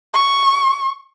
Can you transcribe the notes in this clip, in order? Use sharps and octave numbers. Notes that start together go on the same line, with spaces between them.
C#6